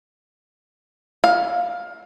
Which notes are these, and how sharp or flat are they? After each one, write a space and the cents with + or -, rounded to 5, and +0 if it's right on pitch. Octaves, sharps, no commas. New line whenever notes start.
F5 +15